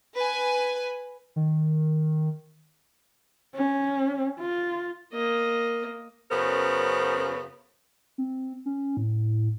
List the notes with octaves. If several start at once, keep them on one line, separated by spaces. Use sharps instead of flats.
B4 G#5
D#3
C#4
F4
A#3 D#5
F#2 C#3 B3 A#4 C5
C4
C#4
A2